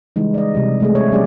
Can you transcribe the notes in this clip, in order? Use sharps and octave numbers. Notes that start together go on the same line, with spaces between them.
C#3 E3 G3 G#3 D#4
D5 D#5
C3 G3
G#3 A3 G#4
C4 C5 C#5
F#3 G3 B3 C#4 G#4 D5